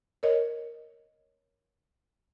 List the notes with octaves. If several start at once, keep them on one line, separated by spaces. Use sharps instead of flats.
A#4 C#5 D#5